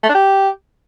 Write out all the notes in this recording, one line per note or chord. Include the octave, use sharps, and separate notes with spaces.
A3
D4
G4